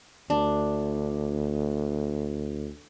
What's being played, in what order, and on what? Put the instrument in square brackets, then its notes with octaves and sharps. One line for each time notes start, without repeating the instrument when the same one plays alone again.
[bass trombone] D2 [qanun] D4